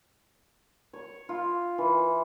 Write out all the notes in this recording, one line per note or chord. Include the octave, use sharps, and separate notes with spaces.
C#5
F4
E3